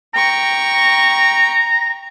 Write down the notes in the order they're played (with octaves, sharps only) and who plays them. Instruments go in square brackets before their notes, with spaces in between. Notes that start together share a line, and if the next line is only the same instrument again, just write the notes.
[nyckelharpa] G5 C#6 [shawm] A#5